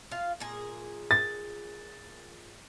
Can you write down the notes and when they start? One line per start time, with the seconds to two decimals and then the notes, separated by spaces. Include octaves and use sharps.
0.11 F4 F5
0.40 A#2 G#4
1.11 A6